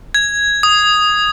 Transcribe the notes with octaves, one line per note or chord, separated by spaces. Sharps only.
G#6
D#6